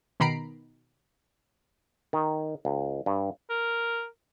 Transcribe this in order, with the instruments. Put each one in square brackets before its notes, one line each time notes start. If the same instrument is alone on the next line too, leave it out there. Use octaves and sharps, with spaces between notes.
[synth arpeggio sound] B2 D#3 A#5 B5 C7 D7
[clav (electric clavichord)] D#3
C#2
G2
[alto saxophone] A#4